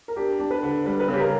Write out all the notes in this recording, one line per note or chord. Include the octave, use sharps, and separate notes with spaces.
A#4
D4 G4
D4
B4
D3
G3 B4
B4
C#3
G4
A#4